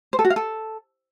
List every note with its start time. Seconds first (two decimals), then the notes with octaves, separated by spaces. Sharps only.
0.13 C5
0.19 A4
0.25 F#4
0.30 F5
0.36 A4